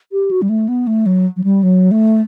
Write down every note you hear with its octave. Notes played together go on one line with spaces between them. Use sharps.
G4
F#4
G3
A3
B3
A3
F#3
F#3
G3
F#3
A3